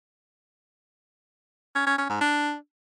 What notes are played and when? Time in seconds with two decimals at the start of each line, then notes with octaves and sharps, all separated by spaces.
1.75 C#4
1.86 C#4
1.98 C#4
2.09 G#2
2.21 D4